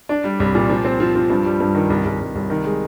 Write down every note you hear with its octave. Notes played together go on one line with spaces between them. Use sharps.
D4
G3
C2
A#2
F3
C4
F3
F3
G2
G3
G2
D#3
C2
C2
C2
C2
D#3
G#3